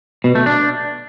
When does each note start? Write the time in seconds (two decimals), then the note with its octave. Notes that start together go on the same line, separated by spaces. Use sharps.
0.24 B2
0.35 A3
0.46 D4